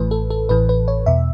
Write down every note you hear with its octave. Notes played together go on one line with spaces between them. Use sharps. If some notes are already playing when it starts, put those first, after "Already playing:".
Already playing: A1 A2 E3 B4
A4
A4
A1 A2 E3 B4
B4
C#5
E2 B2 E5